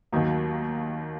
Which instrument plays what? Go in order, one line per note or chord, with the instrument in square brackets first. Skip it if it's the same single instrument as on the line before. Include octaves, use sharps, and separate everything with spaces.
[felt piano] D#2 D#3 F#3 A#3